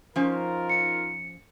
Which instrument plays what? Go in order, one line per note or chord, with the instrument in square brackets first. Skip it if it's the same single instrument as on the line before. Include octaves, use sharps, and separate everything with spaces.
[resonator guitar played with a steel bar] F3 C#4 C5 [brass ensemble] D#4 F4 A#4
[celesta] C#7